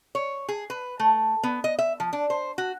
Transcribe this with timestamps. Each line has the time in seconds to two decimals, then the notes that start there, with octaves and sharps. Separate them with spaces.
0.15 C#5
0.48 G#4
0.70 B4
1.00 A3
1.43 B3
1.64 D#5
1.79 E5
2.00 F3
2.13 D4
2.30 C5
2.58 F#4